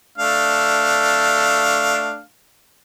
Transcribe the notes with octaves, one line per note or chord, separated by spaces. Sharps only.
A3 D4 F5